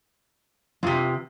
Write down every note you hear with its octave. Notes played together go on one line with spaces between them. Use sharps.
E2 C3 F4